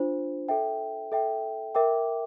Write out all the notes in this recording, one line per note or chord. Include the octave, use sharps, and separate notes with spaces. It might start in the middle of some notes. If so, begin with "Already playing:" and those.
Already playing: D4 F4 C5
A4 E5 G5
A4 E5 G5
A#4 E5 G5 D6